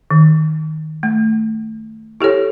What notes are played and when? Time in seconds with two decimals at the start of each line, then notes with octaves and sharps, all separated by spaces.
0.11 D#3
1.03 A3
2.20 E4 G4 A4 C#5